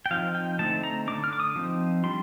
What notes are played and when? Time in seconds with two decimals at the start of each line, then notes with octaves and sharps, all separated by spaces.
0.06 G5
0.11 F3 C4 D#4 F5
0.35 G5
0.59 D3 A3 C4 D#4 A5
0.83 A#5
1.07 D3 A3 D4 D6
1.24 F6
1.33 D6
1.40 D#6
1.56 F3 C4 D#4
2.04 G3 D4 C6